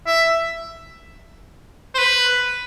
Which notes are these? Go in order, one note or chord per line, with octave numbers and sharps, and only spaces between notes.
E5
C5
B4